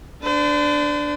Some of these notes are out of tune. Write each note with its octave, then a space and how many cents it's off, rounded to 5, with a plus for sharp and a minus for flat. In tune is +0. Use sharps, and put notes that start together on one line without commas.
D4 +0 C5 -45